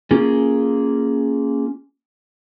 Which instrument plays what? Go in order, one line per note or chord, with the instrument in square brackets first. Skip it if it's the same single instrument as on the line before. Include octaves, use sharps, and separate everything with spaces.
[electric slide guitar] A#3 C#4 F4 G#4